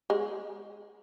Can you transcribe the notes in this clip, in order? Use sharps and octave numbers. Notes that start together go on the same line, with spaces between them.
G#3